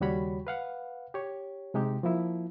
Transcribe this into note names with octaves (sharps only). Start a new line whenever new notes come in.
D#2 C#3 G3 F#4 C#5 B5
B4 F5 F#5
G4 C#5
C3 G#3 D#4 G4
F3 A#3 E4